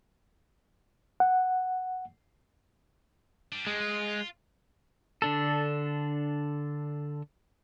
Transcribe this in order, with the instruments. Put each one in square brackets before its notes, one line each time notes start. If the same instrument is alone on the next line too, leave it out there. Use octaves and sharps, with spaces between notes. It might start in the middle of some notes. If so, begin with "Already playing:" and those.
[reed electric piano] F#5
[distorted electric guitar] G3 D4
[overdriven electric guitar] G#3
[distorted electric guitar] F4
[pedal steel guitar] D3 D4 A4